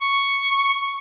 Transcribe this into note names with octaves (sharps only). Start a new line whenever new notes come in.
C#6